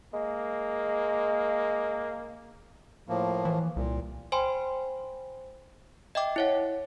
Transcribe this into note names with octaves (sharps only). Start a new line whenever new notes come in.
G#3 A#3
A2 F3 A#3
E3
C2 A#2
C5 G5 G#5 B5 C6
D#5 E5 G5 D6
E4 C#5 F#5